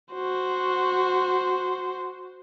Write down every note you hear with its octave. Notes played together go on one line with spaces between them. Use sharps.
F#4 C5